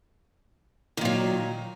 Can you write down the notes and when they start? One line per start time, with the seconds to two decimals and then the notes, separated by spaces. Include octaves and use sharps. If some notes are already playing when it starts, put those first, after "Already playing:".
0.97 D#3
1.01 A#2
1.05 F#3